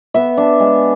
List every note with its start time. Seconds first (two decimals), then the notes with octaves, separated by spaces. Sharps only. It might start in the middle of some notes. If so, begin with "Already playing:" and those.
0.14 B3 E5
0.37 D4
0.60 G#3